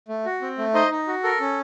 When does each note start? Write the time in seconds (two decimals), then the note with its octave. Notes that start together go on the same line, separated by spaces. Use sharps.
0.08 A3
0.25 F#4
0.42 C4
0.58 A3
0.74 D#4 C5 D#5
0.91 D#4
1.07 F#4
1.23 A4 A#4
1.40 C#4